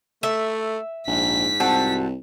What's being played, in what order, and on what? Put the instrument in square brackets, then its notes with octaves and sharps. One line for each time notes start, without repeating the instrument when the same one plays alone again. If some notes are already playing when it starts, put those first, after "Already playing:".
[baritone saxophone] A3 [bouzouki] E5
[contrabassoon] A#1 [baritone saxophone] G#2 [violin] B6
[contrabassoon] C2 [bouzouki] C4 F#4 A5